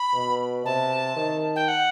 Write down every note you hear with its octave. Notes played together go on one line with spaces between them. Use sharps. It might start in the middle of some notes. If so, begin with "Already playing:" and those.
Already playing: B5
B2
C3 A5
D#3
G5
F#5